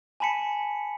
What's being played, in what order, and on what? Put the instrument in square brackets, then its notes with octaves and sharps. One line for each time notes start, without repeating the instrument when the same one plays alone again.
[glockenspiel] G#5 A5 B5 B6 C#7